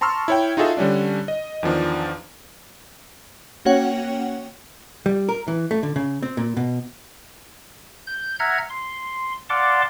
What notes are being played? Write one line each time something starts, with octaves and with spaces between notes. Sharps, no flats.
A5 A#5 C6 C#6 E6 F6
E4 C#5 G5
D#4 F4 F#4 G#4 A4 E5
D3 G3 C#4 D4
D#5
E2 D#3 F3 D4
A#3 C#4 F#4 C#5 F#5 G5
G3
A#4
E3
A3
D3
C#3
C4
A#2
B2
G6
E5 F#5 A#5 F6 G#6
C6
D5 F5 F#5 A5 C6 D6